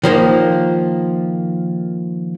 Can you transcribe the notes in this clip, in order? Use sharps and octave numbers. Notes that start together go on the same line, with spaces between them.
D#3 F3 A#3